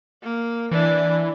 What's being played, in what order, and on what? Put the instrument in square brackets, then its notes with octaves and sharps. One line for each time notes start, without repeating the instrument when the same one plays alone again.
[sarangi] A#3
[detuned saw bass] E3 [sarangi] D4